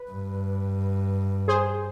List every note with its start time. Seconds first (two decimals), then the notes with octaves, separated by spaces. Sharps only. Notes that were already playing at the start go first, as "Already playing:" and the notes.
Already playing: B4
0.11 G2
1.48 G#4 C5